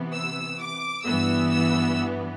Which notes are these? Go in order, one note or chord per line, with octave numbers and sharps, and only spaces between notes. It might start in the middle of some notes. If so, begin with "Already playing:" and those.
Already playing: C3 E3 B3
E6
D6
G2 E3 B3 E6
E6